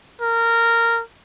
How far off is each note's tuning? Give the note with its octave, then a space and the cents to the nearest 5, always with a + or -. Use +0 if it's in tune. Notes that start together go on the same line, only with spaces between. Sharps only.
A#4 -15